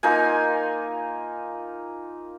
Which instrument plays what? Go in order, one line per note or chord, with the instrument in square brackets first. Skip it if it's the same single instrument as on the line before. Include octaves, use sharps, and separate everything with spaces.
[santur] A#3 D#4 F4 G#5